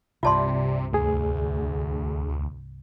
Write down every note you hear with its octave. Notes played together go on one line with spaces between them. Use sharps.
C2 G2 C3 F4 D5 E5 A5 C6
D2 A3 G#4